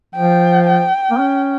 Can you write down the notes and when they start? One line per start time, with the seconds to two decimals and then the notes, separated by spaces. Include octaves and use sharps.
0.15 F3 G5
0.67 G5
1.11 A#3
1.19 C#4